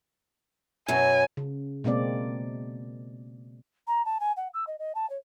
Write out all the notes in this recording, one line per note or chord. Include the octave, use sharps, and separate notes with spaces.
F#2 B2 F#3 G#5
C#3
B2 G#3 A#3 C4 D5
A#5
A5
G#5
F#5
E6
D#5
D#5
A5
C#5